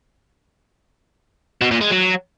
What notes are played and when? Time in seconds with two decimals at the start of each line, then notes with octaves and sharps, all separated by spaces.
1.61 B2
1.71 A#2
1.81 G#3
1.91 F#3